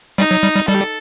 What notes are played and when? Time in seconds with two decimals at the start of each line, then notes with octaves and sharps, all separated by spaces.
0.18 G3 D#4
0.31 F#3
0.43 G3
0.55 G3
0.68 G3 A4